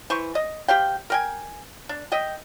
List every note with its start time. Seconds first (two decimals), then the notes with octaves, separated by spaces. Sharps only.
0.10 E3 C5 C#6
0.35 D#5
0.68 G4 C5 F5 G5
1.10 A#4 G5 G#5
1.89 D4
2.12 D#5 E5 G5